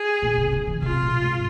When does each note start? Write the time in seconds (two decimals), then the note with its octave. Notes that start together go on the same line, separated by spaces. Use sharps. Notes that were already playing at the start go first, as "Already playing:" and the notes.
Already playing: G#4
0.22 A#2
0.38 C3
0.52 C#3
0.67 E3
0.82 C3 F4
1.02 A#2
1.22 G#2